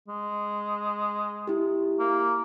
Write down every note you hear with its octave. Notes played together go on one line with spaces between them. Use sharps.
G#3
E4 G4
A#3